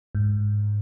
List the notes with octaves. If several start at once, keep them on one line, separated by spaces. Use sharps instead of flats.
G#2